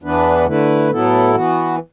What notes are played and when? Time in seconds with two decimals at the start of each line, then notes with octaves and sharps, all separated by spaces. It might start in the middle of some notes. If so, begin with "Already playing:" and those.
0.02 E2 E3 B3 D4 B4
0.46 D3 A3 E4 B4
0.91 A2 F#3 B3 E4 A4
1.35 E3 B3 F#4